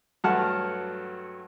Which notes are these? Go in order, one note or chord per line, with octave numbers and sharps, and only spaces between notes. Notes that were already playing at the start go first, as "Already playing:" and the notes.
G2 F#3 A3 F#5 A5 F6